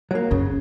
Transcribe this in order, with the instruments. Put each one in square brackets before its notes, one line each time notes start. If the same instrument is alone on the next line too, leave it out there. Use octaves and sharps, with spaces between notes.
[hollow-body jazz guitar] F#3 A#3
[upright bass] F#2 [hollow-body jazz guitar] C#3